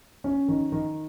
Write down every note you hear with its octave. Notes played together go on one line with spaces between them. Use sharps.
C#4
D#3
D#3